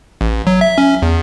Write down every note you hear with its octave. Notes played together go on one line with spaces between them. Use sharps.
A1
F#3
E5
C#4
E2